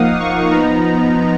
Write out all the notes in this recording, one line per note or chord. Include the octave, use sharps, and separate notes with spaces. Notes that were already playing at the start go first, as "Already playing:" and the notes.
Already playing: F3 A#3 D#4 F5 F#5 D#6
C#6
F3 B3 D#4 A#5